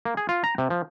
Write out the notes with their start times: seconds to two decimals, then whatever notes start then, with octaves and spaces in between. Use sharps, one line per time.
0.05 A#3
0.17 G#4
0.29 F4
0.44 A#5
0.58 C3
0.70 F3